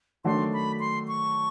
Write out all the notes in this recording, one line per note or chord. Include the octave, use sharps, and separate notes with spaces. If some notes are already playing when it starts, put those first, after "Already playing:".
D#3 F#3 A3 D4 F#4 C6
B5
C6
C#6